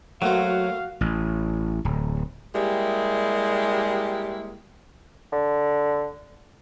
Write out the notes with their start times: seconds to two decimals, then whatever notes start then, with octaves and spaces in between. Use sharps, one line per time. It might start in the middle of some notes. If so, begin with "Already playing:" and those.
0.22 F#3 A3 A#3 F#4 C5 F5
1.01 A1
1.85 D1
2.54 G3 G#3 A#3 E4 G4 G#4
5.33 D3